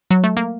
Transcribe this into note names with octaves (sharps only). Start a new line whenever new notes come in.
F#3
A3
A#3